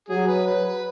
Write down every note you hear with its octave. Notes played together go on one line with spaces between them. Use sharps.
F#3 G#4
B4
B4
B4